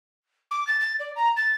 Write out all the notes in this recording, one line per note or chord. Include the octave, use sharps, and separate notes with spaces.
D6
A6
A6
D5
A#5
A6